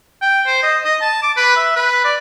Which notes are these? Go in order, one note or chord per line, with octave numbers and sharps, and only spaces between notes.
G5
C5
D#5
D#5
A5
D6
B4
E5
B4
D5